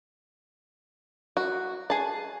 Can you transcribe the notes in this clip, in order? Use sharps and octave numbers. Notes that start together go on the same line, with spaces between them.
F#4
G#4 A5